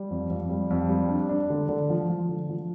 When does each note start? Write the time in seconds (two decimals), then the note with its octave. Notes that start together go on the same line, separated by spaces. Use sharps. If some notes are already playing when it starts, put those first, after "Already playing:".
Already playing: G3
0.10 F2
0.30 F2
0.49 G3
0.70 F2
0.89 G3
1.09 D4
1.29 D4
1.50 D3
1.69 D3
1.90 F3
2.09 F3
2.29 D3
2.49 F3